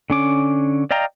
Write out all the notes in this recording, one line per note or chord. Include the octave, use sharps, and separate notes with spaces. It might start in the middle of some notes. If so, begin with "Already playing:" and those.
D3 C#4 D6
D5 D#5 F5 G5 A#5